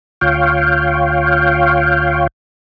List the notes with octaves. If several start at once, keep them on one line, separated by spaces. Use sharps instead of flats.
D2 F4 C#5 F5 G5